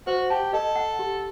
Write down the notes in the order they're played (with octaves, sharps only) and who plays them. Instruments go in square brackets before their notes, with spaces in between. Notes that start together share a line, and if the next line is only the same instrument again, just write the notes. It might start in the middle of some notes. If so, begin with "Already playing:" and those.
[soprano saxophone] F#4 [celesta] C5
[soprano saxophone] G4 [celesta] A5
[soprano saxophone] A4 [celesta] D#5
[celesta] F#5
G4